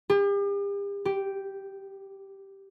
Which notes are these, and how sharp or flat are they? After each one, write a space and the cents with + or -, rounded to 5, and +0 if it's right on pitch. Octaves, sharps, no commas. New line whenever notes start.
G4 +40
G4 -5